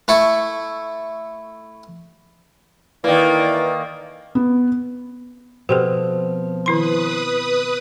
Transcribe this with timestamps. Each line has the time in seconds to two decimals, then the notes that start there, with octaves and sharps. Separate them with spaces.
0.08 A3 E4 A4 C#6
3.04 D#3 E3 A#3 D5
4.35 B3
5.69 B2 F3 C4 G4 A4
6.66 D#3 E4 B4 C6 D#6